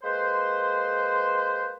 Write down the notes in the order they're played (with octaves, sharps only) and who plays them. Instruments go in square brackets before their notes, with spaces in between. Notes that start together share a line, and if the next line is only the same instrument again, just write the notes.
[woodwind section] G#3 A#3 B4 C5